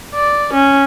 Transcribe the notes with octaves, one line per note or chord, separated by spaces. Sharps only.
D5
C#4